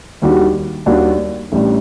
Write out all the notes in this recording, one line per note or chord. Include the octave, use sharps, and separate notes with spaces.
D#2 D#3 G3 D4 F#4
D#2 D#3 G3 D4 F#4
A1 A2 G3 D4